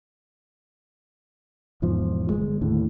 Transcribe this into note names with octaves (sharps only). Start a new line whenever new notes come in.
E1 E2 G#2 F3
G1 E2 G#3
D#2 A2 D3